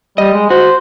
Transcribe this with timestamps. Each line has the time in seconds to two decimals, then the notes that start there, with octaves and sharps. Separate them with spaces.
0.18 G3 D#5
0.33 G#3
0.50 F#4 C5